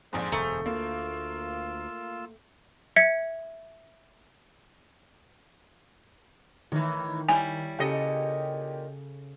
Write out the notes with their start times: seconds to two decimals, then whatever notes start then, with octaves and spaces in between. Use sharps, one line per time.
0.13 A#1 F2 G#2 G#4 C5
0.32 E1 F#2 D3 A3 A#5
0.66 D2 A#3 F4 E6
2.96 E5 G#6 C#7
6.72 A2 D#3 E3
7.29 G3 E4 C#5 G5 G#5
7.79 A#2 C#3 G4 A4 D#5 C#7